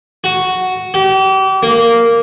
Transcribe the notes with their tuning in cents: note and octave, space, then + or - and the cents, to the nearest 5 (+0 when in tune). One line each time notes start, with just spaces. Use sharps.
F#4 +0
G4 -35
A#3 -5